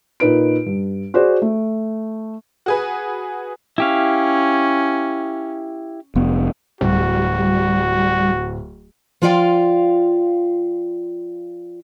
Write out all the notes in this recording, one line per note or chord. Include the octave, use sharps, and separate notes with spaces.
A#2 D#4 B4 D7
G2
F#4 G#4 C5 D5
A3
F#4 G#4 B4
C#4 E4 G4 F5
F1 B3
D1 G3 F#4
F3 F4 D5 F5 G5